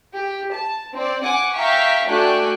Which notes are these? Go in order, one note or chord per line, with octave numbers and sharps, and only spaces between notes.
G4
A5
C4 D5
F#5 G#5 D6
E5 F5 G5 A#5 C#6 B6
A3 D4 F#4 G5 G#5 F#6